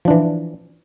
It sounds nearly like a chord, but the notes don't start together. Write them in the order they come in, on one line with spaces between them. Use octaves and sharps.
F3 D4 E3